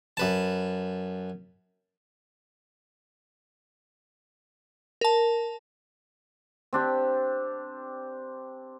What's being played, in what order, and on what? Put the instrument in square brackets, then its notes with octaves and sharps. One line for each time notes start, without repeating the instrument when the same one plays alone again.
[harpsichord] F#2 B4 A5
[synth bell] A#4 A5
[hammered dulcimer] C4 D4 G4